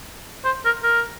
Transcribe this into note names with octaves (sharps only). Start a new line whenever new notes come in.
C5
A#4
A#4